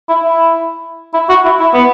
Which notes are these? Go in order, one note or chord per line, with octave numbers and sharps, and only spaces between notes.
E4
E4
E4
F#4
E4
E4
B3